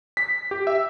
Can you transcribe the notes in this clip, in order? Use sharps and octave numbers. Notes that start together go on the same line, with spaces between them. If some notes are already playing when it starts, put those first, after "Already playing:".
B6
G4
E5